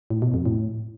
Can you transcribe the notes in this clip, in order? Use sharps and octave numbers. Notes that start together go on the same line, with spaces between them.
A2
B2
F2
A2